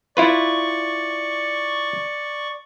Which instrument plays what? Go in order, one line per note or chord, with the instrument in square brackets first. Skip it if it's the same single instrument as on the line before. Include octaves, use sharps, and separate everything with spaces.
[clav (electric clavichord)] E4 F4 B4 [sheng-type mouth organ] D5 C#6